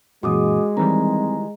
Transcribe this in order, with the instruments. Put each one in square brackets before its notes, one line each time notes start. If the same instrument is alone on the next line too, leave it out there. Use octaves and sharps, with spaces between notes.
[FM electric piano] F#2 A#2 E3 [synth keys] C#3 [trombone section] G#3 [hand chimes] F#4 D6 D#6
[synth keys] D#3 E3 G3 [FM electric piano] C4 [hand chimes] A#5